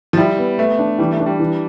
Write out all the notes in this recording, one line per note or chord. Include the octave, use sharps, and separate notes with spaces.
F3
G3 E4
B3
A3 B3
D4
E3 G3
A3
D4
G3
E3